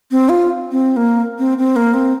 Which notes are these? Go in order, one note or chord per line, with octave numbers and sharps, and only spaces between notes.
C4
F4
C4
A#3
C4
C4
A#3
C4